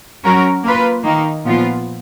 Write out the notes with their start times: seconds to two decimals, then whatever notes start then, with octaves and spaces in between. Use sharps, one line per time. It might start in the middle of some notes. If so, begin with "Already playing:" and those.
0.23 F#3 C#4 F#4 A#4 C#5
0.64 A#3 F4 B4
1.04 D#3 A#3 D#4
1.45 A#2 F3 B3 F4